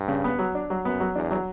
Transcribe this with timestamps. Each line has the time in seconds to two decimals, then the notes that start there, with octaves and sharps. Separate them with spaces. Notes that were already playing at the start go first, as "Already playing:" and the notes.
Already playing: G2
0.08 C#3
0.24 B3
0.39 F#3
0.55 D4
0.70 F#3
0.85 F#2 B3
1.00 F#3
1.15 E2 D4
1.31 F#3